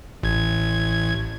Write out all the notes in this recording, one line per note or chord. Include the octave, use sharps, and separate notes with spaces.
A1 G#6